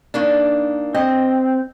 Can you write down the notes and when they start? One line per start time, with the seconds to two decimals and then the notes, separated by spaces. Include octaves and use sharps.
0.14 D#3 A#3 D4
0.95 C4 D#5